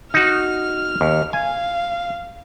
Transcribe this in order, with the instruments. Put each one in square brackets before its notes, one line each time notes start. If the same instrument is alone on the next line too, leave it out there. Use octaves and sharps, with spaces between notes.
[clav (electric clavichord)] D#4 F#4 [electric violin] F6
[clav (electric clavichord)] D#2
[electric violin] F5 [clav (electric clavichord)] G#5